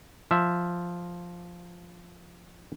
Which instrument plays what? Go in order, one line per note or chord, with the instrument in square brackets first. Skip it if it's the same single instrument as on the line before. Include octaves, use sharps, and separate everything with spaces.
[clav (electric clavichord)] F3 E5